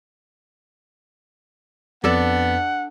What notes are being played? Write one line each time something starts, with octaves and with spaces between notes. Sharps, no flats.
F2 B3 D4 A4 D5 F#5